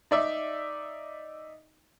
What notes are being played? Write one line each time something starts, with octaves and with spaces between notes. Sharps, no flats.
D#4 D5 E5